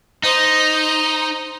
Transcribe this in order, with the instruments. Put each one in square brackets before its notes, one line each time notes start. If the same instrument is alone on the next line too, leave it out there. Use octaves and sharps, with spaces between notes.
[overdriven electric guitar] D#4 [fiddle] C5 D#5